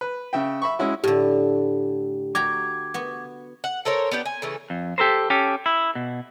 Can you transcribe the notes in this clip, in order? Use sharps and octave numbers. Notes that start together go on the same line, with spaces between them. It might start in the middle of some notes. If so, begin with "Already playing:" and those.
B4
C#3 E5 G5
E5 B5 C#6
G#3 C#4 E4 F#4
A2 D3 G4
F#4 G4 A#5 D6 G#6
B3 F#4
F#5
A4 A#4 C5 C#5
B3 D4 G4 G5
G#5
C#3 E3 A3
F2
G4 A4 A#4 C5
C#4 G4 A4
E4
B2